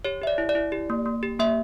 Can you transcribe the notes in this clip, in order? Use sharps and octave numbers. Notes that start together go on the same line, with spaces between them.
G4 C#5
G4 E5
D5
E4
D5
E4
G4
A#3
A#3
G4
A#3 E5